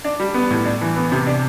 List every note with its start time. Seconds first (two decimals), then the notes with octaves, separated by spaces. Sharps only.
0.04 D4
0.20 G3
0.34 B3
0.50 A2
0.65 D4
0.81 E3
0.96 B3
1.12 C3
1.27 D4